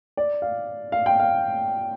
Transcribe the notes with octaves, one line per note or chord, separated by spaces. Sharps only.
D5
F5
F5
G5
F5